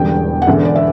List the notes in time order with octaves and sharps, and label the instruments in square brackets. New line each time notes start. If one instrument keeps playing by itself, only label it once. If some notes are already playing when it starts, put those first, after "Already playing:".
Already playing: [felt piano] E1 E2 D3 G3 G5
F#5
E1 E2 D3 E5
D5
E5